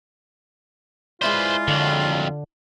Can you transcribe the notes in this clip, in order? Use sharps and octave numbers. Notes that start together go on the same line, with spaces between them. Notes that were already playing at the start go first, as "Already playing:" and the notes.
G#3 E4 F4 B4 C5 D5
F2 D3 F#3